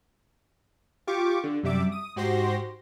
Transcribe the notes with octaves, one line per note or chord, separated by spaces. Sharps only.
F4 G4 C#6 D6
D3
F#2 C3 G3 E5 D6
D#6
G#2 F#4 G4 C5 C6 A#6